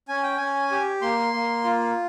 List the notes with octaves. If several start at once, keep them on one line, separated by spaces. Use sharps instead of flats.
C#4 G#5
G5
C#4 G#5
G4
A#3 C6
A#3
F4